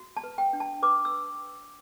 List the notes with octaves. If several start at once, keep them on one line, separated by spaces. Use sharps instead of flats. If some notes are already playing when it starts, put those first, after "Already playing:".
Already playing: F#4
A5
B4
G5
D4
A5
B4 D6
E6